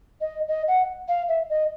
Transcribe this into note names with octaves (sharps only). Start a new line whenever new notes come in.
D#5
D#5
F#5
F5
E5
D#5